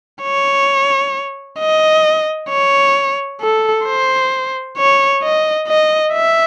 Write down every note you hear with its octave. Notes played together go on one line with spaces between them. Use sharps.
C#5
D#5
C#5
A4
C5
C#5
D#5
D#5
E5